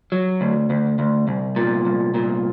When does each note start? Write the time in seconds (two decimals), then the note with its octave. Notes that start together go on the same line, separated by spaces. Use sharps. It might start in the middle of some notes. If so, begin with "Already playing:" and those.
0.12 F#3
0.41 D2
0.70 D2
0.99 D2
1.28 C2
1.56 A#2
1.85 C2
2.14 A#2